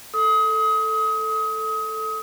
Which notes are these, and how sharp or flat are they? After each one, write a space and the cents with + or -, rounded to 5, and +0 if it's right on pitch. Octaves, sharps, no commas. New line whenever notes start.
A4 +5 D#6 +30